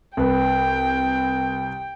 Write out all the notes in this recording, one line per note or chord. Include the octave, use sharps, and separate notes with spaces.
C2 B4 G5